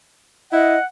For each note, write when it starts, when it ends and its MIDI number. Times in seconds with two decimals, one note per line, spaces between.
0.52 0.76 64
0.52 0.79 75
0.52 0.85 78